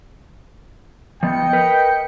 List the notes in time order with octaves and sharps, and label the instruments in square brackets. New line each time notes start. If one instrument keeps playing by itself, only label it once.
[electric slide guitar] F3 B3 [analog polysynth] D#5 C#7 [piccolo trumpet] G5
[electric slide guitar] A#4 B4